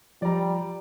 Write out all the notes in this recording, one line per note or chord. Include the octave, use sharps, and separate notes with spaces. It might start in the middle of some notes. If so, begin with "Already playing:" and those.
F3 G3 D5 A#5